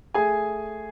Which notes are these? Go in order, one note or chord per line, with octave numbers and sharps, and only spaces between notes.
A3 G#4 G#5